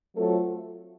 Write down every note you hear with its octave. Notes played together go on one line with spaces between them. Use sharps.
F#3 A3 C4 F4 A4